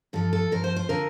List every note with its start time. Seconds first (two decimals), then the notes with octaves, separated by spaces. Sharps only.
0.13 G2 F3 A4
0.33 A4
0.52 G2 F3 A#4
0.64 C5
0.76 C5
0.89 D3 F3 A#4